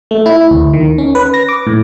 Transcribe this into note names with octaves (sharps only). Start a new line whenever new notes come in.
A3
E4
D2
D#3
C#4
B4
A#6
D6
A2